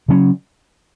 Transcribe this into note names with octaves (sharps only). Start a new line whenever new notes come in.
C#3 F#3 C#4